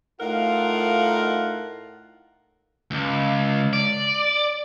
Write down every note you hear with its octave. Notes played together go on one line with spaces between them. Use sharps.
A2 D#4 F4 A#4 F5 F#5
C#2
D5